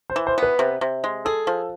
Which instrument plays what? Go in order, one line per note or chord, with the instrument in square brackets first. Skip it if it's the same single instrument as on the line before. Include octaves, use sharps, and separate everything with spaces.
[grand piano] C5
[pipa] E3
[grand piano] C5
[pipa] B3 [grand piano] B4
[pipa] C3
C3
G#3
[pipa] G#4 [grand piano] A4
[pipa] F3